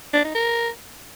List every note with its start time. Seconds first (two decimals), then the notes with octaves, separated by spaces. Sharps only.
0.14 D4
0.24 D#4
0.35 A#4